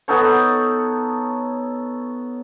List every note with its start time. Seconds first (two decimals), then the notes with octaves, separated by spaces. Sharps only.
0.08 B3 D#4 A4 C#5